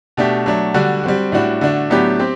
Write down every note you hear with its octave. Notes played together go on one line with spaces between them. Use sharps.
B2 A3 D4 G4
F#3 A3 D4
D3 G3 D4 F#4
G3 C4 F#4
A2 G3 D4 F#4
D3 A3 D4 F#4
A2 F#3 B3 D4 G4
C4 G4